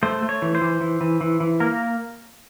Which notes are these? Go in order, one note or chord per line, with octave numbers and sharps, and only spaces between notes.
A3 C5
A3
C#5
E3
C5
E3
E3
E3
E3
E3
A#3 A#4